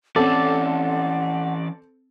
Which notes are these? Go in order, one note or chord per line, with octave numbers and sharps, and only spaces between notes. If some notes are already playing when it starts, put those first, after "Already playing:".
E3 C4 C#4 A4 D5 F#5